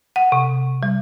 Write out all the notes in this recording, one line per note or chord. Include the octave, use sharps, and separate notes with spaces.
F#5
C3
G3